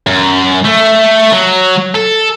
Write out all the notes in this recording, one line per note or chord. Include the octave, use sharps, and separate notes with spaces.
F#2
A3
F#3
A4